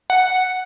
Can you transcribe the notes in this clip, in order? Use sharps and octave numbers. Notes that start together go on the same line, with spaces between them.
F#5